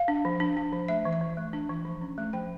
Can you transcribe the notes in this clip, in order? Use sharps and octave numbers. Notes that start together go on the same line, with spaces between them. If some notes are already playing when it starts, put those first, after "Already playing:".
Already playing: F5
D4
F3
D4
D4
F3
A3 E5
E3
E5
E3
A3
D4
E3
F3
C#4
A3
F3 G5